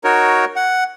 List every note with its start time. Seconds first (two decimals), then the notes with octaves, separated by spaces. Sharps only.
0.04 D#4 F#4 A#4 C#5
0.56 F#5